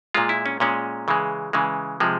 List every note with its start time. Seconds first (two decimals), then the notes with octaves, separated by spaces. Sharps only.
0.14 A#2 G#3 F4
0.29 E4
0.46 C#4
0.60 A#2 G#3 C#4
1.08 C#3 E3 G#3
1.53 C#3 E3 G#3
2.00 C3 F3 G#3